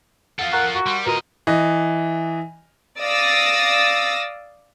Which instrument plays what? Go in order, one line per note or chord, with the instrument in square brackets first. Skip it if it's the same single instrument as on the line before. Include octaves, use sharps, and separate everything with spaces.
[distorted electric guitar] F4 A4 [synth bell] F5 F#5
[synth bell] A#4 A#5 C#6 [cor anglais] F#5
[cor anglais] F#4
[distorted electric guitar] G3 [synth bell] F#5 C6
[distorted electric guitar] A2 D#5 [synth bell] F4 F#4 B4 [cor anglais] A#4
[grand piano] E3 D#5
[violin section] D5 F5 D#6 E6 A6 A#6